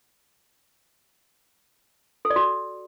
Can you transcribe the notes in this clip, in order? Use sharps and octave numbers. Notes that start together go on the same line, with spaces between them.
A4
D5
F#4